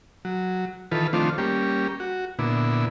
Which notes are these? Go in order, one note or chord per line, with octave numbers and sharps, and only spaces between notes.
F#3
D#3 E3 F4 A4 B4
D#3 F3 A3 C4 D4 F4
G3 A#3 C#4 G4
F#4
A#2 D3 B3 E4